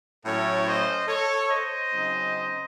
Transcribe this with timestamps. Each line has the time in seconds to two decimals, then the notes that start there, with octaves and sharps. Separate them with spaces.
0.25 A2 F#3 A3 C#4 E4 A4 C#5
0.67 C5 D#5
1.07 A4 C#5
1.49 C5 D#5
1.91 C#3 F#3 C4 D#4